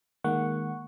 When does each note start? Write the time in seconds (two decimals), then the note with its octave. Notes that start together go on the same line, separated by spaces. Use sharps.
0.24 D#3 G#3 A#3 F#5 C#6